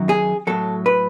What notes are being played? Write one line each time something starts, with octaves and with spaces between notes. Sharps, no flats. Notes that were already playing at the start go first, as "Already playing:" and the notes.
Already playing: F#2 D#3 F#3
G#4
A2 F#3 A4
B4